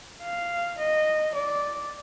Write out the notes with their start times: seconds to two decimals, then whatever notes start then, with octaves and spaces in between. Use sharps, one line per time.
0.23 F5
0.79 D#5
1.35 D5